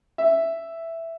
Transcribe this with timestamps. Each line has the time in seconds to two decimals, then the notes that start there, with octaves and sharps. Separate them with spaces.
0.18 E5